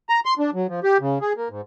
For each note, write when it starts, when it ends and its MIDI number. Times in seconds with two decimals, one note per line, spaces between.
0.09 0.20 82
0.25 0.34 84
0.39 0.50 62
0.54 0.67 54
0.69 0.80 53
0.84 0.98 67
1.01 1.18 49
1.21 1.33 68
1.37 1.48 58
1.50 1.61 44